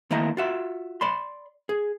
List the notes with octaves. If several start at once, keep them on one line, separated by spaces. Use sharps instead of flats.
D#3 A3 A#3 E4 D#5 A#5
F4 F#4 E5
D5 B5 C6
G#4